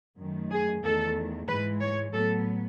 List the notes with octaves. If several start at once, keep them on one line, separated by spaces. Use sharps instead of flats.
F#2 D#3 A3
G#4
E2 D#3 A3 A4
G#2 E3 G#3 B4
C#5
A2 F#3 B3 A4